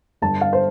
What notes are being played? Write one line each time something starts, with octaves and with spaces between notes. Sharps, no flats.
G1 A5
F5
C5